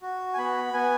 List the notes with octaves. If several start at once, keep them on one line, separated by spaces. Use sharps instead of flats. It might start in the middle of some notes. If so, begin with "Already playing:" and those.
F#4
G#5
B3 B5
B3 G#5